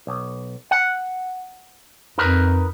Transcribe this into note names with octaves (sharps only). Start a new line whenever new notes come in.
B1
F#5
F2 D#4 A#4 B4